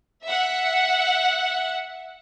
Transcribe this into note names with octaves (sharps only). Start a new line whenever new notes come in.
E5 F#5